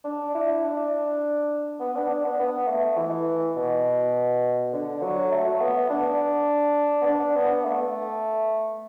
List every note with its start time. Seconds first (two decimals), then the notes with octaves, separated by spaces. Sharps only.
0.05 D4
0.35 E4
0.64 D4
1.81 B3
1.96 D4
2.10 D4
2.24 B3
2.40 B3
2.68 A3
2.97 E3
3.56 B2
4.73 D3
5.02 F#3
5.32 A3
5.61 B3
5.90 D4
7.02 B3
7.06 D4
7.36 B3
7.65 A3